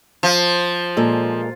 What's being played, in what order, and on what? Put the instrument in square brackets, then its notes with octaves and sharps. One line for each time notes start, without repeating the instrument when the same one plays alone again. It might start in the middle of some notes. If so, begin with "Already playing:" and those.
[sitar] F3
[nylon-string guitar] A#2 G#3 A4